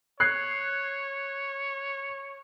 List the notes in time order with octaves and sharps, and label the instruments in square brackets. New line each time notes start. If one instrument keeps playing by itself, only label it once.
[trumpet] C#5 [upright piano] F#6 G#6 C7